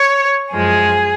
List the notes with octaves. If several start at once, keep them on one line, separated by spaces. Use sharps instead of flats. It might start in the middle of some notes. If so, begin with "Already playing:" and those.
Already playing: C#5
F#2 F3 G#3 G#4